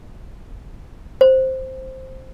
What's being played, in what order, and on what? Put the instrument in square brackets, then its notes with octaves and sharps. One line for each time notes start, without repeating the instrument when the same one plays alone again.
[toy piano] C5